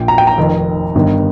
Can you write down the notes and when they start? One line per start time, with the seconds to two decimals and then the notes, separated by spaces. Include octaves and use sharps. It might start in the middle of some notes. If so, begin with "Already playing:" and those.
Already playing: A#1 A#2 G5
0.08 A#5
0.18 G5
0.27 A#5
0.38 F1 F2 D#3
0.95 G1 G2 D#3